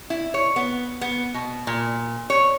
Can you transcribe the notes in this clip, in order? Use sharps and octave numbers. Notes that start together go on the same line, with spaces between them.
E4
C#5
B3
B3
B2
A#2
C#5